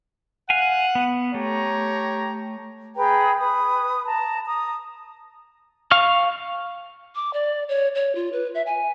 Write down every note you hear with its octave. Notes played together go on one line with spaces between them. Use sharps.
F5 F#5 G#5
B3
A3 G4 C#5 A#5
G#4 B4 G5 A#5
B4 D#6
A5 A#5
A#5 D#6
F5 C#6 F6
D6
D5
C#5
C#5
F4
B4
E5
G#5